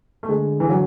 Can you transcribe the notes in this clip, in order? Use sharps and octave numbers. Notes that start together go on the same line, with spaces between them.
A3
D3 G#3
E3
F#3